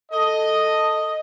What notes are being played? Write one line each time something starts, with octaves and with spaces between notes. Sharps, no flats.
A4 D#5